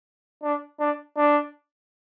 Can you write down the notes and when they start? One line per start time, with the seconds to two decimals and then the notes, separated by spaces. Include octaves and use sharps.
0.43 D4
0.80 D4
1.17 D4